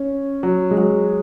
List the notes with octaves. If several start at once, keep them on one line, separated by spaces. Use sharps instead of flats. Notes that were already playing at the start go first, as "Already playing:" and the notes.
Already playing: C#4
F#3
G#3
F#3